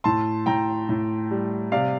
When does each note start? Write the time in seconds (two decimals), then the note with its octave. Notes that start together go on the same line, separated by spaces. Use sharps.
0.04 A2 A5 C6
0.46 A2 G5 A#5
0.89 A2
1.31 G3
1.72 C3 D5 F5